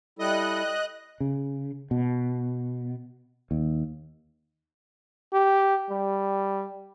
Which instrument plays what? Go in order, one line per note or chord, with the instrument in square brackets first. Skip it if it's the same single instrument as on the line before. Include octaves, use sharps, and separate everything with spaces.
[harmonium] G3 E4 A4 [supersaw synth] D#5 F#6
[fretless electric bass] C#3
B2
D#2
[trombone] G4
G3